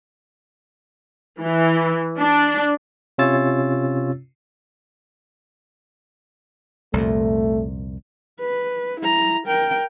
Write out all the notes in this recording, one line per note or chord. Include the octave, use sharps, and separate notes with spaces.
E3
D4
C3 C#4 F4 C#5 E6 A6
C2 F2 A#2 A3
B4
E4 A#5
A#4 G5